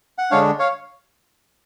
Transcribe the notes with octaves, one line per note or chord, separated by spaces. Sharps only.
F#5
D3 G#3 D4 C#5 F5
C#5 F5